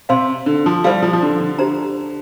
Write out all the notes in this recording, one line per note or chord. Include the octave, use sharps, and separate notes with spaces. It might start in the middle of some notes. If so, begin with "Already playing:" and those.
C3 C5 F5 C6
D3
F3
G3 F4 C5 F5
F3
F3
D3
D3
G4 C5 A#5